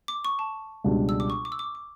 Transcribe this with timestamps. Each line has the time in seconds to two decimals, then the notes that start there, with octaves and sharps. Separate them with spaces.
0.08 D6
0.25 C#6
0.39 A5
0.84 C#2 B2 G3 D4
1.09 E6
1.20 D6
1.30 C#6
1.45 D6
1.52 E6
1.59 D6
1.75 D6